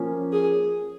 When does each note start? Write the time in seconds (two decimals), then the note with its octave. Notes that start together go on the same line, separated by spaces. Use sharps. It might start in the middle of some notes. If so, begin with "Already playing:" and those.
Already playing: F3 A#3 C#4
0.32 G#4